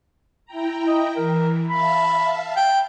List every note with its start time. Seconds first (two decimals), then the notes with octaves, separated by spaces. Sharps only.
0.45 E4 G5 A#5
0.87 D#5
1.16 E3 A#4
1.69 E5 F5 A5 B5
2.57 G5